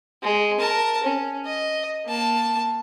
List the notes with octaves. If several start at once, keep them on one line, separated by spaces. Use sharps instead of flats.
G#3
A#4 A5
C#4
D#5
A#3 A5